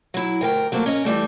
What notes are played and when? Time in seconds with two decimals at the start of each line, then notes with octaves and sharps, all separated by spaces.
0.14 F#3 E4
0.41 D2 A#4 G5
0.72 F#3 A3 A#3 C4 F4 F#4
0.86 C#4 A#4 D#5
1.05 E3 F#3 G3 A3